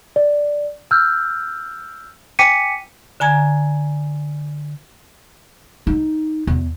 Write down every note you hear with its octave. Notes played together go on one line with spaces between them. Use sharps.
D5
E6 F6 G6
G5 G#5 D6 B6 C#7 D#7
D3 G#5 A#5 G#6
D#4
E2